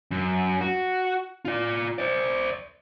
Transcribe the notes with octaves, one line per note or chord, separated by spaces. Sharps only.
F#2
F#4
F4 D5
C5 D5